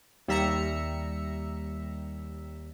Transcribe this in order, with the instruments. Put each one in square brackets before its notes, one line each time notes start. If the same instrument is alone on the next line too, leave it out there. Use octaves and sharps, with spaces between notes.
[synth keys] D#2 G3 E5 A#5 C#7